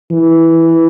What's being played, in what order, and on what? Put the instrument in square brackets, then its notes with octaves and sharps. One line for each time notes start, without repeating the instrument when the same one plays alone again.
[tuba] E3